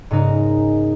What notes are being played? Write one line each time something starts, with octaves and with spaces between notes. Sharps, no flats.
G#2 C#3 D#4 A#4